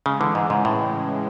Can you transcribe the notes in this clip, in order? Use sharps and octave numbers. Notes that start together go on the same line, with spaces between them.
C#3 G#3
D3 E3
G#2 G#3
G#2 C#3
A2 E3